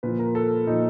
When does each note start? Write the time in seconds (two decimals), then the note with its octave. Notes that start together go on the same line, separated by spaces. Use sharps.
0.03 A#2 F3 B4
0.19 A#4
0.35 A4
0.67 A#2 F3 D#4